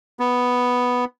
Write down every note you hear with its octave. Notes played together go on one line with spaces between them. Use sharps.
B3